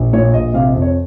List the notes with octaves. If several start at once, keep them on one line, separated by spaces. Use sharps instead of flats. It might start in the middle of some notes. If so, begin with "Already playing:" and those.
Already playing: A#1
A#2 C#5
A#1 D#5
C3 F5
D#5
F2
C#5